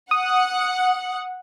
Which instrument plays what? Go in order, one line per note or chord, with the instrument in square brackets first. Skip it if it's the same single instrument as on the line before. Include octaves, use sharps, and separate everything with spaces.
[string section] F#5 [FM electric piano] D#6